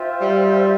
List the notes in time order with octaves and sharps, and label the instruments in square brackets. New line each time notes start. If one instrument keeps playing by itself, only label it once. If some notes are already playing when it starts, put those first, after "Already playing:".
Already playing: [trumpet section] F4 C5 E5 G5
[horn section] G3